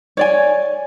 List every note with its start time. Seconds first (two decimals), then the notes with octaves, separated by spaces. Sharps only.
0.17 C#5 D5 G#5